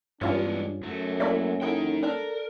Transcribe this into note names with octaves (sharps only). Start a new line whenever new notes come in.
G2 E3 G#3 B3 C#4 D4 F4
F#2 F#3 A3
A#3 E4 D5 E5
D#4 E4 G#4 A4 G5
D4 A4 A#4